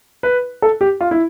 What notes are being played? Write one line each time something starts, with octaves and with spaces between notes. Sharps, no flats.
B4
A4
G4
F4
E4